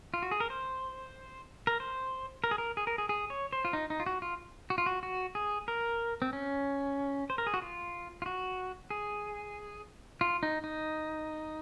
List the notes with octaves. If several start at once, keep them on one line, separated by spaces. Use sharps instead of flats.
F4
F#4
G#4
A#4
C5
A#4
C5
A#4
G#4
A#4
G#4
A#4
G#4
G#4
C#5
C5
F4
D#4
D#4
F4
F#4
F4
F#4
F4
F#4
F#4
G#4
A#4
C4
C#4
C5
A#4
G#4
F#4
F4
F4
F#4
G#4
F4
D#4
D#4